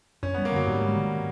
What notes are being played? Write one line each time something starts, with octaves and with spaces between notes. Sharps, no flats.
F#2 C#4
G3 B3
A#3
D3 F#3
G#2 G3
G#3
D#3